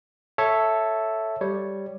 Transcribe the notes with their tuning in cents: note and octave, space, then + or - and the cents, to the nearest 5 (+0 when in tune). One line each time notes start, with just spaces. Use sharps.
A4 +0 C#5 +0 E5 +0
G3 +0 C#5 +0